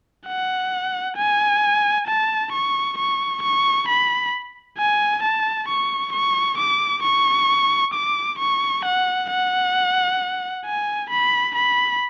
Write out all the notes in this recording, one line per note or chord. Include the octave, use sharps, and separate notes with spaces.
F#5
G#5
A5
C#6
C#6
C#6
B5
G#5
A5
C#6
C#6
D6
C#6
D6
C#6
F#5
F#5
G#5
B5
B5